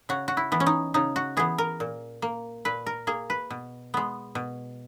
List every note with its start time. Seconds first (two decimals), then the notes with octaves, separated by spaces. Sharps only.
0.09 C#3 F#4
0.28 F#4
0.37 E4
0.52 E3 B3
0.60 C#4
0.66 D#4
0.94 C#3 D#4
1.16 F#4
1.37 E3 B3 G#4
1.58 A#4
1.80 A#2
2.22 A#3
2.65 A#2 B4
2.86 A#4
3.07 A#3 G#4
3.30 B4
3.50 B2
3.94 G#3 B3
4.35 B2